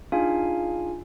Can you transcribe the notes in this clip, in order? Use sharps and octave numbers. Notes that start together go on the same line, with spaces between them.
D4 D#4 F4 G#4 F5 G#5